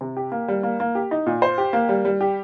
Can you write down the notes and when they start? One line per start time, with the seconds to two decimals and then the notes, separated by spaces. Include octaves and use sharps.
0.01 C3
0.17 G4
0.32 A#3
0.48 G3
0.63 A#3
0.80 A#3
0.95 G4
1.11 D#4
1.26 A#2
1.42 C5
1.58 G4
1.73 A#3
1.89 G3
2.05 G3
2.21 G4